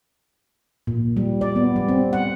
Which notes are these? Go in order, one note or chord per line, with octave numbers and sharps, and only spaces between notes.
A#2
G3
D5
B3
G3
C4
F#5